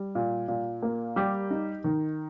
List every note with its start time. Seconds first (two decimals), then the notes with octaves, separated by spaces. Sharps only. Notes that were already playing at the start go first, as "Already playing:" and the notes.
Already playing: G3
0.15 A#2
0.48 A#2
0.82 A#3
1.16 G3 G4
1.51 D#4
1.84 D#3